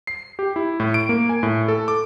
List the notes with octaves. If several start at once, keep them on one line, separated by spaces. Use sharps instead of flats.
C7
G4
E4
A2
D7
A#3
G#5
A2
A4
D6